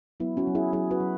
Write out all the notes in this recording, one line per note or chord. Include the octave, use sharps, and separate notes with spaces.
F#3 B3 E4
C#4 F#4
F#3
E4 G#4
F#3 E4 G#4
F#4 B4
F#3